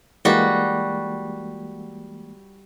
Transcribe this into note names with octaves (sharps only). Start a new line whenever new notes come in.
E3 G3 G#3 A#3 F#4